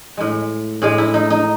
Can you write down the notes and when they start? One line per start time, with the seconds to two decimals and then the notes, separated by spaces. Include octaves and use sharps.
0.17 A2 G#3
0.82 A2 G#3 G#4
0.98 E4
1.14 D#4
1.30 D#4